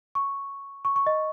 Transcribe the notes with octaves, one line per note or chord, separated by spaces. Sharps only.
C#6
C#6
C#6
D#5